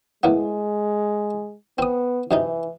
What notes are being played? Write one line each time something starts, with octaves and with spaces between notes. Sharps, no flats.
A2 G#3 A#3 B3
B3 C4 D#6
F#2 C3 E3 D#4